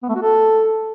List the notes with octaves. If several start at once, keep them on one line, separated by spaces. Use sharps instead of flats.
B3
A3
F#4
A4